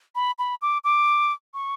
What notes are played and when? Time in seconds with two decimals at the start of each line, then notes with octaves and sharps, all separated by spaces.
0.15 B5
0.39 B5
0.62 D6
0.84 D6
1.54 C#6